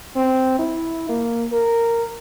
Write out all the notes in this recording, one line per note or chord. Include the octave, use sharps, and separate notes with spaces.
C4
E4
A#3
A#4